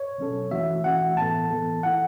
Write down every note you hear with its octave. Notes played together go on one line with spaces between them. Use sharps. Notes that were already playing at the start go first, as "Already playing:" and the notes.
Already playing: C#5
B2 F#3 C#4 A4
E3 A3 C#4 F#4 E5
E3 A3 C#4 F#4 F#5
A2 E3 B3 A4 A5
A2 E3 B3 A4
E3 A3 E4 A4 F#5